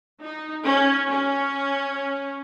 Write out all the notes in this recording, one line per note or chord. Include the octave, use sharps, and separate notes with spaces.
D#4
C#4
C#4